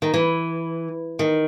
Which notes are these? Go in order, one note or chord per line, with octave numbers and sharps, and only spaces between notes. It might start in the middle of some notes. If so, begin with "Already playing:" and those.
D#3
E3
D#3